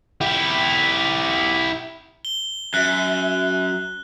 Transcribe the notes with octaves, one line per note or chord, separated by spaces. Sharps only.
E4 G4
G7
F#2 E5 F#6